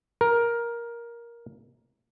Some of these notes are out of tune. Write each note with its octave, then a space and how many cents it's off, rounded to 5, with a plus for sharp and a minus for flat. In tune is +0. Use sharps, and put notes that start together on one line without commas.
A#4 +10